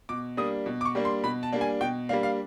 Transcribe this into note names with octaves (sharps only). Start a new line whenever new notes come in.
B2 D6
G3 A#3 D4 D#6
B2
D6
C#6
G3 A#3 D4
C6
B2 B5
A5
G3 A#3 D4
G#5
B2 G5
G3 A#3 D4 F5
F5